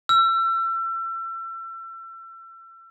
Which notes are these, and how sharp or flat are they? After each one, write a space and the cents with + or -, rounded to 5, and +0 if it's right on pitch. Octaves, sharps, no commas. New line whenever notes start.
E6 +35